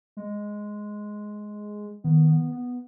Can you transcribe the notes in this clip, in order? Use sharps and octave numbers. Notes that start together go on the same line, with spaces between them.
G#3
D#3 B3
B3
B3